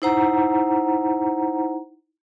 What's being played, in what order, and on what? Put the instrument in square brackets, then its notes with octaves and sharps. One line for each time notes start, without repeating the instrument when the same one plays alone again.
[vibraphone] D#4 E4 C5 F#5 A#5